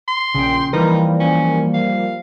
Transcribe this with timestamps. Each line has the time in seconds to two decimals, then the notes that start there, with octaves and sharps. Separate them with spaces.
0.08 C6
0.34 A#1 C#3 G5
0.73 E3 F3 G3 A#3 D#4 A#4 B4
1.20 C#4
1.74 F5